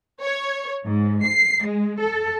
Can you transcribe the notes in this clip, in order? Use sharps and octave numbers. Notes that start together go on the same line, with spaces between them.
C#5
G#2
C7
G#3
A4